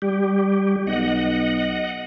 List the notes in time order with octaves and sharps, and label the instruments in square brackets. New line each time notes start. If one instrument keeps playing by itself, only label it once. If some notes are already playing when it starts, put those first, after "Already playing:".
[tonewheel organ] G3 G4
[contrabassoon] B1 [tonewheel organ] D#5 F#5